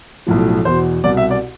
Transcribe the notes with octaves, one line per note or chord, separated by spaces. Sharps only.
B1 A2 F3
E2 B2 C5
C2 B2 D5
E5
D5